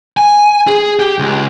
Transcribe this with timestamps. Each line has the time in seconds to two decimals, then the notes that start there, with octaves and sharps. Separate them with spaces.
0.17 G#5
0.67 G#4
0.99 G4
1.19 C#2